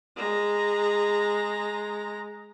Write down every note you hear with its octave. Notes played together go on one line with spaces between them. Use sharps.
G#3 A#5